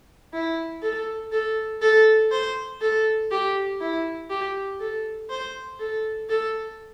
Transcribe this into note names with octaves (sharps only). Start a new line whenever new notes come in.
E4
A4
A4
A4
C5
A4
G4
E4
G4
A4
C5
A4
A4